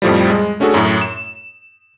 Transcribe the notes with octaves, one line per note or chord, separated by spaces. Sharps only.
F2 A2 F3 G3
G#3
A3 C#4 D4 F#4 G#4 A4
F#2 A2
E7